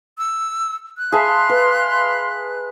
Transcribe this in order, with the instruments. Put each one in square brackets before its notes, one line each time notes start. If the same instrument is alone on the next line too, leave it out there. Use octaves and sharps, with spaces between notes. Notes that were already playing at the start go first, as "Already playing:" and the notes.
[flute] E6
F#6
[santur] G#4 E5 A5 [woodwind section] F5 B5 C6
[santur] B4